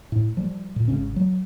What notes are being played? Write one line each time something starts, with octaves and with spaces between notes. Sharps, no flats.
A2
F3 G3
A#2
G#1 C#3 C#4
F#3